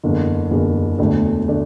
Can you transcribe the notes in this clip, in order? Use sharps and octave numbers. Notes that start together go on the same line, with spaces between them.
F#1 E2 D3
F#1 E2 D3
E1 D2 D3 A3 D4
D3 A3 D4